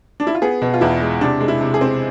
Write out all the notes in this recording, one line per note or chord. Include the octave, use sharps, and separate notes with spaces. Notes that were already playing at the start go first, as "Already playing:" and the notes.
D4
E4
F4
B3 G#4
B2
F4
E2 E4
G#3
C3 D4
G#3
E4
C3
G#4
C4